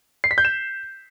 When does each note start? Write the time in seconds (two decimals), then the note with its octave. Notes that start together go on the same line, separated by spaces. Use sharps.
0.24 C7
0.31 B6
0.38 G6
0.45 E7